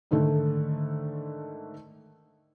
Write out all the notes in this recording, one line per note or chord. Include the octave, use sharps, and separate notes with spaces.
G#2 D3 D#3 A3